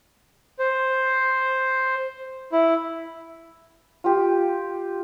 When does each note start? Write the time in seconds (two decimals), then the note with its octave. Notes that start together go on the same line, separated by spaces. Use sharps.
0.59 C5
2.52 E4
4.04 F4 G4